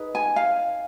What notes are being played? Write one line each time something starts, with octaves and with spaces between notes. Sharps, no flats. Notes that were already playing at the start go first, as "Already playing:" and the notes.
Already playing: D#4 G#4 B4
G#5
F5